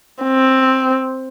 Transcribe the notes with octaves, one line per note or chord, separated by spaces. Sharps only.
C4